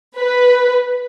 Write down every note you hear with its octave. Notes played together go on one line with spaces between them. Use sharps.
B4